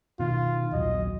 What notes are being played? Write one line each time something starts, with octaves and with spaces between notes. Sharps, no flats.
B2 D#3 F4
A#1 D#2 F#3 D#5